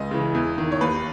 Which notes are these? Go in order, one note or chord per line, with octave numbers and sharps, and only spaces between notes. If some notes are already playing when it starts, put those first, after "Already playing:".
Already playing: C#2 D#5
C#3 E3
E2
D#3
C#5
D#2 B4